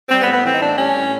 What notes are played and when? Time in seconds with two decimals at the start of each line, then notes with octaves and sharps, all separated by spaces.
0.09 G3 C4
0.22 B3
0.27 A2
0.32 B3
0.44 E3 C4
0.54 D#4
0.60 A2 D4
0.77 G3 C#4
0.95 A2